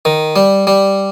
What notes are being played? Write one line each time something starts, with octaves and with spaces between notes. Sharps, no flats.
D#3
G3
G3